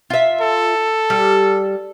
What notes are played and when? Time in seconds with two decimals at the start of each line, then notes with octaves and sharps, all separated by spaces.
0.10 F4 E5
0.41 A4
1.10 G3